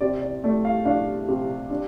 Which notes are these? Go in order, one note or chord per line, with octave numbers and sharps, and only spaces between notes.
C3 D5
D5
A3 D5
F5
D4 F5
C3
D4